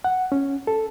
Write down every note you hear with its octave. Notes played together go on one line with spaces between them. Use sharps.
F#5
C#4
A4